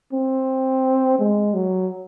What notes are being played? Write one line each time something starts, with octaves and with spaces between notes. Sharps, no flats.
C4
G#3
F#3